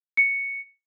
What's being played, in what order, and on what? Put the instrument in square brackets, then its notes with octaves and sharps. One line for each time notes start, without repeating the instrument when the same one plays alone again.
[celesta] C#7